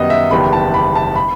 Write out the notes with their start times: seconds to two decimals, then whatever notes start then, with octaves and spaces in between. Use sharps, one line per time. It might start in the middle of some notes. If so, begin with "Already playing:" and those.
Already playing: F#2 D#3 G3 B3 D#5
0.10 E5
0.31 F#1 E2 D#3 G3 B3 B5
0.53 A5
0.74 B5
0.95 A5
1.16 B5